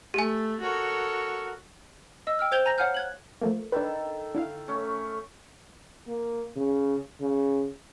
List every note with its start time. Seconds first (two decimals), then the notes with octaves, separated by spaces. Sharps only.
0.14 A3 G4 G#5
0.61 F#4 A4 A#4 C#5
2.27 D#5 E6
2.39 G5 E6 F6
2.52 C5 G5 G6 G#6 F7 G7
2.65 G#5 A#5 G6 A#6 F7
2.78 C#5 F5 F#5 G#5 F6 G6
2.94 F#6 G#6 F#7
3.41 F3 A3 A#3
3.72 D#3 D4 A4 B4
4.35 D3 E4 F5
4.68 A3 C#4
6.08 A#3
6.57 C#3
7.21 C#3